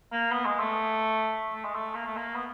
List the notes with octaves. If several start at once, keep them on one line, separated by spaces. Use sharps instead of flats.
A#3
B3
G#3
A3
A3
G#3
A3
A#3
A3
A#3
B3